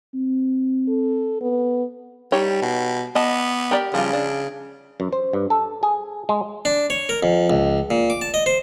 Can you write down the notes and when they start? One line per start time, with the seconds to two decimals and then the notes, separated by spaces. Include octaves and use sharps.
0.15 C4
0.88 A4
1.41 B3
2.32 G3 D#4 G4 C#5
2.62 B2
3.15 B3 D#5 A5
3.71 G4 A#4 D5
3.94 C#3 F3 G3 F4
4.13 D4
5.00 F#2
5.12 C5
5.33 G2
5.50 A4
5.83 G#4
6.29 G#3
6.65 D4
6.90 C#5
7.09 A#4
7.23 F2
7.50 C#2
7.91 A#2
8.10 D6
8.21 A5
8.34 D#5
8.46 C5